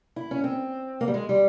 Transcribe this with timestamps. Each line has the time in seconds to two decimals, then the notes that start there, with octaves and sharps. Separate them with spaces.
0.16 E4
0.31 C#4
0.44 C4
1.01 A#3
1.08 G3
1.14 G#3
1.29 G3